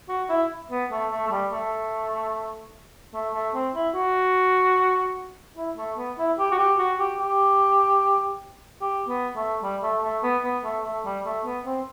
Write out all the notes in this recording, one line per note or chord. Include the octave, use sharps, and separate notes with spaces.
F#4
E4
B3
A3
A3
A3
G3
A3
A3
A3
C4
E4
F#4
E4
A3
B3
E4
G4
F#4
G4
F#4
G4
G4
G4
B3
A3
G3
A3
A3
B3
B3
A3
A3
G3
A3
B3
C4